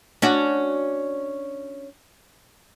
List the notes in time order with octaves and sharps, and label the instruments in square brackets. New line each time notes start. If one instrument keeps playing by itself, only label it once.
[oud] C#4 D4 F#4